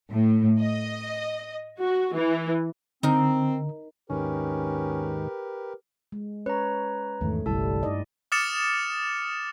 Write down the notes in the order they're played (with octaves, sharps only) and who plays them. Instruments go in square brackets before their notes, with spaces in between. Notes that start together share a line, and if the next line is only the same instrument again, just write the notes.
[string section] A2
D#5
F#4
E3
[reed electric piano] D3 [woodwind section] C4 [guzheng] D#4 A#4
[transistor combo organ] D#2 G#2 D#3 [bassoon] C#4 [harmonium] G4 A#4 B4
[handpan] G#3
[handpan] C#4 C#5 [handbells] B4 A#5
[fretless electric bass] E2 G#2 D#3 [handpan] A3
[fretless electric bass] G1 C2 [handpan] G3 E4 [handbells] A4 A5
[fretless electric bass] G2 [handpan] D#4 D5 D#5
[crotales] D6 D#6 F6 A6 C#7 E7